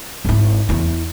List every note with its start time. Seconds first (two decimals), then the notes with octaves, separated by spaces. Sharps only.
0.25 G#1 E4
0.69 E2 E4